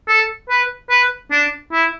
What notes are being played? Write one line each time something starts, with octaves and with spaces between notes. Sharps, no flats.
A4
B4
B4
D4
E4